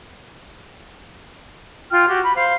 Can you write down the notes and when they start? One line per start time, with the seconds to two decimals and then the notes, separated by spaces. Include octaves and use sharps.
1.91 F4 G5 F6
2.08 F#4 G4
2.21 B5
2.36 C5 F5